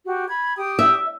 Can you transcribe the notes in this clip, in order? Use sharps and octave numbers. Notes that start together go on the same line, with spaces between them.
F#4 G4
B5 G#6
G4 G5 D#6
E5